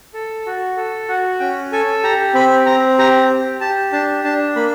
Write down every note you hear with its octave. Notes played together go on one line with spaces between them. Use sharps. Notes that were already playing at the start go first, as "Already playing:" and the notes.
A4
F#4
A4
F#4 F#5
C#4 G5
A4 G#5
G4 A#5
C4 B5
C4 A#5
G4 A#5
G4
G4 A5
D4 A5
D4 A5
A#3 B5